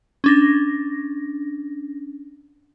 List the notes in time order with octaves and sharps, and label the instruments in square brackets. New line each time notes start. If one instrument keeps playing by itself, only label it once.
[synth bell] C#4 D4 A#6